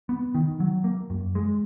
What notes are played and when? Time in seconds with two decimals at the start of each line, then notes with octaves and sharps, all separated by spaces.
0.09 B3
0.35 D#3
0.60 F#3
0.84 A#3
1.10 F#2
1.35 G#3